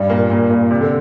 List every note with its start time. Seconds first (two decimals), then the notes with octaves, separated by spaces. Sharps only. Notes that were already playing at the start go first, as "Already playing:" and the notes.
Already playing: G2 G3
0.09 A#2 A#3
0.30 A#2 A#3
0.50 A#2 A#3
0.71 C3
0.81 D3